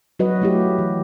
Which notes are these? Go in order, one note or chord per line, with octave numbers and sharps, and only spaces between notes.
F#3 F#4 B4 D#5
A3 E4 G4
E3